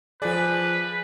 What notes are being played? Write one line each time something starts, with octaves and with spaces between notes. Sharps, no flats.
F3 G#4 B4 D5